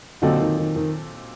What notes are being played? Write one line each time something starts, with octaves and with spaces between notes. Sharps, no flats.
A#2 D3 F#3 C4 D#4 A4
D#3
D#3
D#3